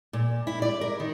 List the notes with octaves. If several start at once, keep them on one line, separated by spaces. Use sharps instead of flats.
A#2
E4
D5
A#4
D#3